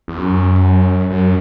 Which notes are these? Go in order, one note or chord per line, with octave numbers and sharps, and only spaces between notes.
E2
F#2
F#2